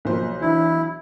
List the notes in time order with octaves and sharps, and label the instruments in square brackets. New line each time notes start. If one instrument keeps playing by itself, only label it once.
[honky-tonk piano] B1 C5 [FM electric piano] F3 A#3
[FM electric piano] E3 D4 [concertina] E4